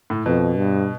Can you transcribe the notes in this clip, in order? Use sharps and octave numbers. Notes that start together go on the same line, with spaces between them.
A2
F2 B2
G2